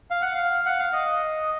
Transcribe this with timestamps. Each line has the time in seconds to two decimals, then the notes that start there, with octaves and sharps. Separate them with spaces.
0.10 F5
0.22 F#5
0.34 F5
0.66 F#5
0.79 F5
0.93 D#5